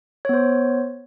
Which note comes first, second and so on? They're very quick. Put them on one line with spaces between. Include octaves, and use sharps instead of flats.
C#5 B3 C5